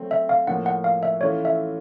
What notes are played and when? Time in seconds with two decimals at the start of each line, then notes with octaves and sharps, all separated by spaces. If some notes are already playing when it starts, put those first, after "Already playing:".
Already playing: F#3 A3 C4
0.11 E5
0.29 F5
0.47 A2 F3 A#3 F#5
0.66 F#5
0.84 F5
1.03 E5
1.21 E3 A3 C#4 F4 C#5
1.45 E5